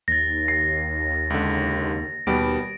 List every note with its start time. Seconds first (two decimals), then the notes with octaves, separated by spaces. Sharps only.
0.08 D#2 A6 A#6
0.48 C7
1.30 C#2 D3
2.27 D#2 B2 G3 B3 D7